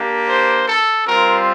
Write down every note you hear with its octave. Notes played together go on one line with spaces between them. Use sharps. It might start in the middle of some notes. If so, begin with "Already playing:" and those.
Already playing: A#3 D4 G4
C5
A4
G3 C4 F4 A#4